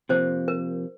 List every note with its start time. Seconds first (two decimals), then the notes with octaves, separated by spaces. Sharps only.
0.09 C3 F3 A#3 C5
0.48 A#4